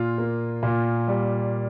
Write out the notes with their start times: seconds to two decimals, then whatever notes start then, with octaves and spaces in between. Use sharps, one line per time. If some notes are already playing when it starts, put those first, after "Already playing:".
Already playing: A#2 F4
0.18 A#3
0.63 A#2
1.08 G3